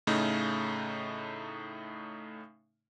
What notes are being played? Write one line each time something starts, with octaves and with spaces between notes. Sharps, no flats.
A2 C#3 A3 D#4